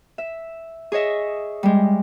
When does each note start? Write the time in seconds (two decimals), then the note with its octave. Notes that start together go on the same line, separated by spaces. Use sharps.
0.18 E5
0.92 G#4 C#5 D#5 E5
1.63 G3 G#3